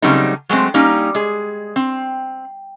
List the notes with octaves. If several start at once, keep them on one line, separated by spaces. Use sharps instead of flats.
C#3 F#3 G3 A3 C4 D#4
F#3 G#3 A3 C4
G3 A#3 C#4 D#4
G#3 G#4
C4